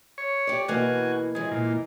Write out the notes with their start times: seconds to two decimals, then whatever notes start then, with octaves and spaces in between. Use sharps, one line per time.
0.18 C#5
0.47 G4 D5
0.68 B2 E3 A#3 F#4 G#5
1.35 G#2 E3 G#4
1.51 A#2